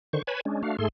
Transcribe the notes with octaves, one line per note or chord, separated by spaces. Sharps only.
D3 D#3 C5 C#6
B4 C#5 G#5 A5 B5
G#3 C#4 D4
A3 D4 F#4 F5
G#2 A3 G#4 A4 C6